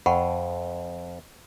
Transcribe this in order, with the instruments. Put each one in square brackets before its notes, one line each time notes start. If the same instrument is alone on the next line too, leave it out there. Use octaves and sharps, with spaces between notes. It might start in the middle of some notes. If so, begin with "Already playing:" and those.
[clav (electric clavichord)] F2 [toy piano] F#5 B5 C#6